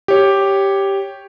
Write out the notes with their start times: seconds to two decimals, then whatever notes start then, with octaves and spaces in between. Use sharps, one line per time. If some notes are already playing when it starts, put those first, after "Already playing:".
0.08 G4 C#5